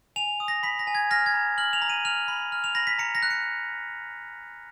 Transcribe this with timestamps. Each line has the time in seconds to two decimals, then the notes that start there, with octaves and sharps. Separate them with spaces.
0.16 G#5 F7
0.40 D#6
0.48 A#6
0.63 B5 B6
0.79 A#6
0.87 G#5
0.95 G#6
1.11 F6 A#6
1.26 G#6
1.34 A#5
1.58 F6 F#7
1.73 F7
1.82 A#5
1.90 D#7
2.05 F6 F7
2.28 B5
2.52 F6
2.64 F7
2.75 B5 A#6
2.87 B6
2.98 A#5 C#7
3.15 A#6
3.22 F#6
3.30 C#7